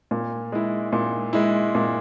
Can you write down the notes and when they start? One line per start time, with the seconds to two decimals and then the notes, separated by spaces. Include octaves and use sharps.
0.11 A#2
0.52 G#3 E4
0.92 A#2
1.33 G#3 E4
1.75 A#2